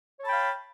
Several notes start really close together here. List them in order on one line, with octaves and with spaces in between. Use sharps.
C#5 A5 B5 G5 F5